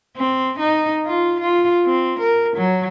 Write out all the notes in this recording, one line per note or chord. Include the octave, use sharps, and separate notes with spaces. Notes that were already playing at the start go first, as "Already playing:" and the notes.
C4
D#4
F4
F4
C4
A#4
F#3